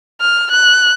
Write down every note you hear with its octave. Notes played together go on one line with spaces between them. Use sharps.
F6
F#6